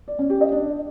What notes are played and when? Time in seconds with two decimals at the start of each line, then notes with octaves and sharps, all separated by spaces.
0.08 D5
0.19 C#4
0.30 G4
0.41 D#5
0.52 D4